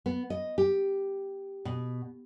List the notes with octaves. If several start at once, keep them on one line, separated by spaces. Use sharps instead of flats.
B3
D#5
G4
B2